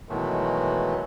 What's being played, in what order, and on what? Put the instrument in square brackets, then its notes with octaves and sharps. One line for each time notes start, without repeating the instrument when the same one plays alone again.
[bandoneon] B2 D#3 E3 F#3 G#3 A3